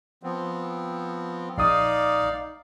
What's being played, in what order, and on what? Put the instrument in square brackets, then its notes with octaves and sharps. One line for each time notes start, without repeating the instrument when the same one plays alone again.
[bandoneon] F3 B3 C4
[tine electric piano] A#1 D#6 [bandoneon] D#4 D5 F5